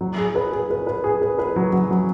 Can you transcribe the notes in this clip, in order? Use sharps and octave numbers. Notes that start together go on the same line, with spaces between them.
F#3
G#4
B4
G#4
B4
B4
G#4
B4
B4
F#3
F#3
F#3